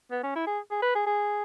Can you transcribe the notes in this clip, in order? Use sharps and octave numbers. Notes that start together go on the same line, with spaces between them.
B3
C#4
E4
G#4
G#4
B4
G#4
G#4